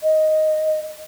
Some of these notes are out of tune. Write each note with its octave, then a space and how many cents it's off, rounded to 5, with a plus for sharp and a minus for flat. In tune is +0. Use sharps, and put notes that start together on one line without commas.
D#5 +0